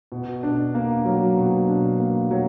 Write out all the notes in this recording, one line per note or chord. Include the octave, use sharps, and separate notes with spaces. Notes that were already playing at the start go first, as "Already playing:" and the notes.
B2
D4
A#3
F#3
B2
D4
A#3
F#3